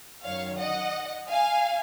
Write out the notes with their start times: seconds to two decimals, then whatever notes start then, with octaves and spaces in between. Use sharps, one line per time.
0.24 F#2 D#3 F#3 C#5 F5
0.59 D#5 F#5
1.28 F5 G#5